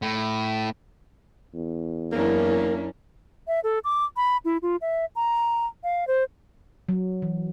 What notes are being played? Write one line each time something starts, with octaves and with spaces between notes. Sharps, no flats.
A2
E2
F#2 A#3 C#4 D4 E4 A#4
E5
A4
D6
B5
E4
F4
E5
A#5
F5
C5
F#3
E3